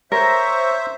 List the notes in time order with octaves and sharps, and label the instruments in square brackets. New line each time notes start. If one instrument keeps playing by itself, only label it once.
[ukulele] A#4 [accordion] C5 E5 [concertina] C#5